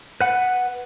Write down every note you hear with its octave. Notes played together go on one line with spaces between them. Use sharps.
B4 F#5